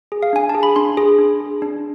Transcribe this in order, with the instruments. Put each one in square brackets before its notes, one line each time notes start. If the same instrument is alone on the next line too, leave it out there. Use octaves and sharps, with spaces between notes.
[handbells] G#4
F5
D4 G#5
A5
G#4
B5
D4 C6
G#4
D4
G#4
D4